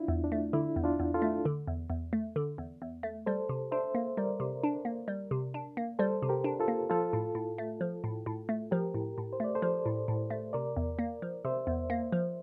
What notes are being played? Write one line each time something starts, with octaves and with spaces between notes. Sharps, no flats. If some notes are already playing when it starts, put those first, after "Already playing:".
Already playing: D4 E4 F4
E2
D4
A3
D3 E4
E2
D4 F4
E2
F4 A4
A3
D3
E2
E2
A3
D3
E2
E2
A3
G3 A4 C5
C3
D4 C5 E5
A#3
G3 A#4 D5
C3
D4
A#3
G3
C3
D4
A#3
G3 A4 C5
C3
G4 A#4
D4
F4 A4
A#3
F3 F4 A4
A2
A2
A3
F3
A2
A2
A3
F3 G4 A#4
A2
A2
C5
A3 D5
A4 C5
F3
A2
A2
A3
C3 A#4 D5
E2
A#3
F3
C3 C5 E5
E2
A#3
F3